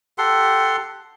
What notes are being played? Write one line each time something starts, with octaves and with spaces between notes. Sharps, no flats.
G4 A4 F#5 C6